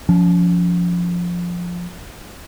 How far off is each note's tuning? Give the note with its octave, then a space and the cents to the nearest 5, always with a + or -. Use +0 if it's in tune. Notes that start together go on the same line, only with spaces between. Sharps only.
F3 +10 C#4 +40